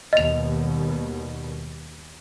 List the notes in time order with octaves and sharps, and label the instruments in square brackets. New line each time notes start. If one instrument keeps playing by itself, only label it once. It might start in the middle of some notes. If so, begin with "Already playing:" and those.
[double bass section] D#2 B2 G3 [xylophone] D#5 F7